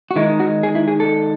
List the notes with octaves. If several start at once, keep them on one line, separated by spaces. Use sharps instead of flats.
F#4
D#3 G#3 D#4 E4
F#4
G#4
E4
G#4
A4